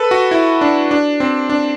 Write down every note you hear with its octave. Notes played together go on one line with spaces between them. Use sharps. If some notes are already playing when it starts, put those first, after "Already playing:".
Already playing: A4 B4
F#4
E4
D4
D4
C4
D4